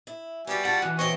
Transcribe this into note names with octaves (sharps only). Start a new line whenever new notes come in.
E4
G3 B3 F#4 G#5
F4 F#4 F#5 A5
B2 E3 F#5
B2 C4 C#5 D#5 C#6